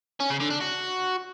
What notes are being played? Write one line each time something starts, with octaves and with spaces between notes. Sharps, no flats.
C#4
C#3
D3
D4
F#4